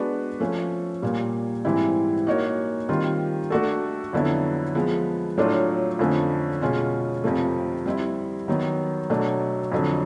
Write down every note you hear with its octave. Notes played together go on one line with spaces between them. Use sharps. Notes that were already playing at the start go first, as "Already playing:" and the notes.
Already playing: G#3 B3 D4 F#4 B4
F3 A3 C#4
A#2 G3 A#3
G#2 E3 G3 C4 E4
A#3 D#4 F#4 A#4 C#5
D#3 G3 C4 F4
A3 D4 F#4 A4
F2 D3 F#3 B3 E4
F3 G#3 B3
A2 F#3 A3 D4 F4
F2 D3 F3 A3 C#4
B2 G#3 C#4 F4
F2 C3 F3 A3
G3 C4 E4
D#3 F#3 B3
B2 F#3 A3 D4
F2 D3 F#3